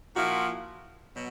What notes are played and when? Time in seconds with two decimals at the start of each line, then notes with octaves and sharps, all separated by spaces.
0.15 A#2 F3 E4 F#4
1.14 B2 F#3